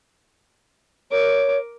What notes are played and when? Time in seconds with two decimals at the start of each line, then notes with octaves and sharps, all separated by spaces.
1.11 A#4 C#5 D6